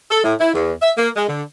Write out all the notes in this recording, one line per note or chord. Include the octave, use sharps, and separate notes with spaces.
A4
A2
E4
E2
E5
A#3
G#3
D3